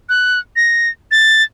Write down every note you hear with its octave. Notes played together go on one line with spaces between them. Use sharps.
F#6
A#6
A6